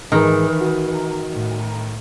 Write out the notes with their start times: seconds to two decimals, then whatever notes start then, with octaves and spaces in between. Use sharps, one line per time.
0.12 G#2 D#3 E3 G#4 A#4
0.61 F#4
1.33 A2